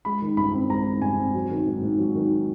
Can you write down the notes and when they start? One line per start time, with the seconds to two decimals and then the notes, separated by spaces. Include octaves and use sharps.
0.05 G#3 B5
0.22 D#3
0.37 G2 B5
0.54 C4
0.70 G#3 A#5
0.86 D#3
1.02 G2 G#5
1.18 C4
1.34 F#3
1.51 D#3
1.67 G#2
1.82 G#2
1.98 F#3
2.15 D#3